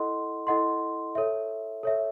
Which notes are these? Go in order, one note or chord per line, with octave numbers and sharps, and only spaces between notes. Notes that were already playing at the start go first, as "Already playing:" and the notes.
Already playing: E4 A4 D#5 F#5 C6
E4 A4 D#5 F#5 C6
A4 C#5 E5
A4 C#5 E5